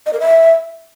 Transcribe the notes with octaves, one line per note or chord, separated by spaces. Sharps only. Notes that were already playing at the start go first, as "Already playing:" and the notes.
D#5
A#4
E5